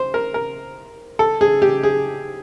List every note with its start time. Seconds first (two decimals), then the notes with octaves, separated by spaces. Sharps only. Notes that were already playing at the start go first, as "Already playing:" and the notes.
Already playing: C5
0.14 A#4
0.34 A#4
1.19 A4
1.41 G#4
1.62 G4
1.83 G#4